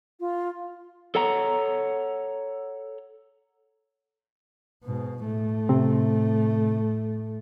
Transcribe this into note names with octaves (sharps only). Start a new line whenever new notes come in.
F4
A4 C#5 F#5 A#5
G#2 B2
A2 A3
C3 C4